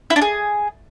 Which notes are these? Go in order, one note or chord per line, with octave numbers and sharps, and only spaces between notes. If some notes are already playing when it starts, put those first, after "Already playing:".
E4
D4
G#4